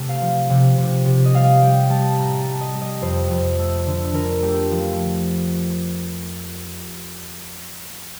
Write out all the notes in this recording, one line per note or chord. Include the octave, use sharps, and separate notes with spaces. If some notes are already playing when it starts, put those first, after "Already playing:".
Already playing: C3 A3
F5
F3
C3
C3
C3
D#5
G3 F5
G3 G5
G3 A5
A2 A#5
A5
G3
D#5
G3
D#5
F2 C5
F2
A3
D3
D3 A#4
A3 G4
F3